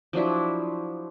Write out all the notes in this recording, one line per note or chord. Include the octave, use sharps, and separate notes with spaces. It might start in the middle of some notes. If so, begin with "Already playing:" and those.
F3 F#3 D4 E4